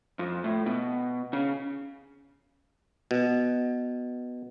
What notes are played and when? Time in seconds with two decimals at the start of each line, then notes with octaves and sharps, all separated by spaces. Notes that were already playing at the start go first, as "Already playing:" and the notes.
0.19 F2
0.44 A2
0.66 B2
1.33 C#3
3.11 B2